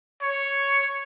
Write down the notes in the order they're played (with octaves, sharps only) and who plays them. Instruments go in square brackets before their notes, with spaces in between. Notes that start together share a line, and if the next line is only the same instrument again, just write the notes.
[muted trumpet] C#5